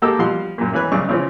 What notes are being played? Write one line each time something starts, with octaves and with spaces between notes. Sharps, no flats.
G#3 A#3 F#4 G4 A4 E6
B2 F3 G3 F5 F#5 C6
F#2 A#2
G#1 E3 C#4 B4 G#5 F#6
B1 G2 C#3 D5 C#6
C#3 E3 F3 C4 C#4 F4